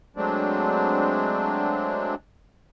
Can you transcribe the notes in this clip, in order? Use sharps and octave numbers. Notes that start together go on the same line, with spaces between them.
F#3 G#3 A3 C4 D4